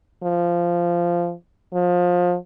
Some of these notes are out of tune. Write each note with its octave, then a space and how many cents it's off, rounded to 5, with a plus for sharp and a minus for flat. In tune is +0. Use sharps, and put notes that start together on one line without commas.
F3 -10
F3 +25